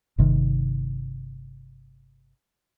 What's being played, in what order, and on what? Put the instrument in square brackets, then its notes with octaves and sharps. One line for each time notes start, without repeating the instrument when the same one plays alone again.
[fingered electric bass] G1 C3 D#3